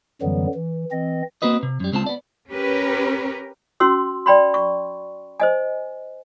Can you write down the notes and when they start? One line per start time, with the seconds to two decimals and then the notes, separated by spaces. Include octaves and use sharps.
0.22 F#2 D3 E3 F#3 G3 B3
0.54 E3
0.92 E3 C4 D#5
1.42 A#3 C4 F#4 B4 D#5
1.63 C3
1.80 F#2 G3
1.93 C#2 G#3 C4 F4 A5
2.06 B3 D5
2.51 C#4 G4 A#4 B4
3.80 C#4 F#4 C6 E6
4.26 D5 G5 B5 C6
4.54 C#6
5.40 C5 D#5 G#5